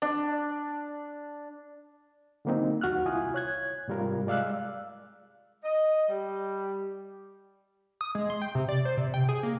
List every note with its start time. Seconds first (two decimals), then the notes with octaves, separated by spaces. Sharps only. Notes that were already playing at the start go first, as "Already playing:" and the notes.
0.02 D4
2.45 D3 F#3 A#3 C4 D#4
2.81 D#2 F#4 F6 F#6
3.06 C2 E4 F4 G#5 D#6
3.34 C#5 F#6 G#6
3.88 G#2 C3 G3 F4 A#4
4.27 G#3 D5 F5 E6 F#6
5.64 D#5
6.08 G3
8.01 D#6
8.15 G#3
8.30 C6
8.42 G5
8.55 C3
8.69 D5
8.85 C5
8.97 C3
9.14 G5
9.29 G#4
9.43 A#3